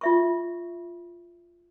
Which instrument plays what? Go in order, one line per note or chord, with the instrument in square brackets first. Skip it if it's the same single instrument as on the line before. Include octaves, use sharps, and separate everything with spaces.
[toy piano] F4 E5 C#6